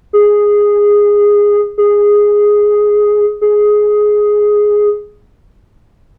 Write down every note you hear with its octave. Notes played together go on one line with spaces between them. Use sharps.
G#4
G#4
G#4